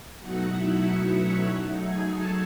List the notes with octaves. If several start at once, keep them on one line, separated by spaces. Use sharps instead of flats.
B2 F#3 A3 D#4 F#4 F#5
E4 E5
E4 E5
C#4 C#5
F#3 A3 D#4
G#4 G#5
A4 A5